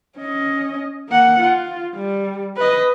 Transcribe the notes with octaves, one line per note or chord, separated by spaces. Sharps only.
C#4 D#5
A#3 F#5
F4
G3
B4 D#5